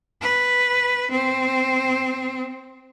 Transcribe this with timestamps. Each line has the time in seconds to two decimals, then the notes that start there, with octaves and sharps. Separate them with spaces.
0.22 B4
1.11 C4